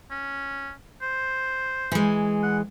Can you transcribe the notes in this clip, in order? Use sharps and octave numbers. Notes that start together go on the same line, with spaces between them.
C#4
C5
E3 G#3
F#5